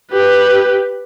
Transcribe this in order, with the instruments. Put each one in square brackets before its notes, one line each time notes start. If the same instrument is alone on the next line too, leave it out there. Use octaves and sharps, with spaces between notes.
[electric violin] G4 B4